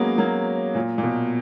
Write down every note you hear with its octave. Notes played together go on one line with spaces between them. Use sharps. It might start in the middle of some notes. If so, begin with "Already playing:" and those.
Already playing: F#3 G#3 A#3 B3 C#4
F#3 A#3
A#2
A#2
B2